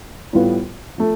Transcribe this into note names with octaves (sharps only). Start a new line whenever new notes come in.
A2 G3 B3 F4
F3 A3